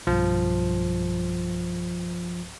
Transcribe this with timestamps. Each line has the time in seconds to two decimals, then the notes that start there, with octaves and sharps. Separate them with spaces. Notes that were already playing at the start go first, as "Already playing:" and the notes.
0.07 B1 G2 F3